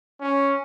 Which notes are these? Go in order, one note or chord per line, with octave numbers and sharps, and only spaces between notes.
C#4